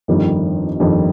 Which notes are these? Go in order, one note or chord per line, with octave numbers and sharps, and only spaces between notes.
G1 F2 D#3 G3
G1 F2 D#3 G3